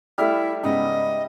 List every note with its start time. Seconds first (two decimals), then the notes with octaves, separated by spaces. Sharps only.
0.18 G3 A3 E4 E5 F5 F6
0.63 G#2 C#3 B3 D#5